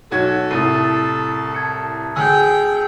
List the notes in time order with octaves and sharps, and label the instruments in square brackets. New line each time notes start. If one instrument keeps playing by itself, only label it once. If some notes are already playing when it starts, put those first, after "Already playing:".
[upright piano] B1 F#4 G#6 [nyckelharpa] A4
[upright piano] C2 A2 [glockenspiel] D#6 A6 D#7
[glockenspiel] A5 G#6 C#7
[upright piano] D2 G#5 [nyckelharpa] G#4 G5 [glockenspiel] E6